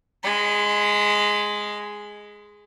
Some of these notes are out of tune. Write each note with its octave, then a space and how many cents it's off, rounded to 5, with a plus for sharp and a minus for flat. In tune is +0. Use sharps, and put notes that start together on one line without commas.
G#3 +0 B5 +40